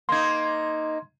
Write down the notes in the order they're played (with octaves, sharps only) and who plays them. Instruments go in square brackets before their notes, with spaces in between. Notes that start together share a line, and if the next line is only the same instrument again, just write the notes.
[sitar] A#3 D#4 [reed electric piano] C6 G#6